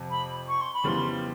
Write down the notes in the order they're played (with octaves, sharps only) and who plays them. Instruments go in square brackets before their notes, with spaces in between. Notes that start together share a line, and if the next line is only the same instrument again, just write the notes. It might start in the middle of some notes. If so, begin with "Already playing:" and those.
Already playing: [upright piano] F2 C3
[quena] B5
C#6
C6
B5
[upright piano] F2 C#3 E3 G3 B3 [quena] C6